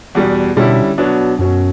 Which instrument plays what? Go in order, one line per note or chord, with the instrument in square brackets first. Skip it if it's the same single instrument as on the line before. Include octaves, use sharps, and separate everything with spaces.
[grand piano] E2 B2 G3
[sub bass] B2 [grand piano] D3 G3 C#4 E4
[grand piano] B2 F#3 B3 D4
[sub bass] F#2 [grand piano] B2 F#3 C#4